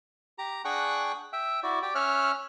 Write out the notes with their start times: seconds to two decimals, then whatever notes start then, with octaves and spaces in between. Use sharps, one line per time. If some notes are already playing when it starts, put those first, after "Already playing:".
0.38 G4 A#5
0.65 D4 G#4 F#5 G5 C#6 F#6
1.33 E5 G5
1.63 E4 F#4 D5
1.82 G4 D5 G5
1.95 C#4 C#5 E5 F6 F#6